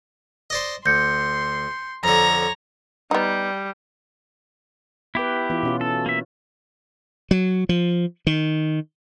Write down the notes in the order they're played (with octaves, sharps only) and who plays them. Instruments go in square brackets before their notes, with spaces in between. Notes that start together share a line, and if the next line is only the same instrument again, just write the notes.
[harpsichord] C5 D5 D#5
[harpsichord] D2 [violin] C6 [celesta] G6 C#7
[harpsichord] F2 D3 [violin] C#5 A#5
[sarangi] G3 [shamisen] B3 D#4
[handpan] B3 B4 [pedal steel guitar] E4 G4
[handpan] E3 B3 F4
B2 C#4 F4
[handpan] C#4 [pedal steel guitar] A4
[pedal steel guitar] A#3 E5
[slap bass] F#3
F3
D#3